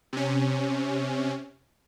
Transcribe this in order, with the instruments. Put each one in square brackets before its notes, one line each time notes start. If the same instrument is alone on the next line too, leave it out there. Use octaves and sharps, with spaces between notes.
[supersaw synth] C3 C#4